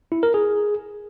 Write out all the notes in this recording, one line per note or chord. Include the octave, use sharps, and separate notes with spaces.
E4
A#4
G#4